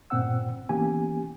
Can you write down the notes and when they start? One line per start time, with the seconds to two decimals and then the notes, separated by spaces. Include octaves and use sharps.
0.10 G2 A#2 C4 C5 F#5 E6
0.69 E3 A#3 B3 C#4 G4 G#5